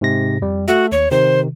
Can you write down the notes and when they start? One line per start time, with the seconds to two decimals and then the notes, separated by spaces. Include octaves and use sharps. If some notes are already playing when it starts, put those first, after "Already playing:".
0.01 G#2 C3 A#6
0.42 F2 G3
0.68 A3 F#4 E5
0.92 D#2 C#5
1.11 C3 D#3 C5